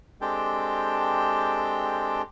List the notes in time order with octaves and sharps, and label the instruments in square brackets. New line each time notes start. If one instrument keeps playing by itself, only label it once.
[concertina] G#3 C4 D4 G4 A4 G5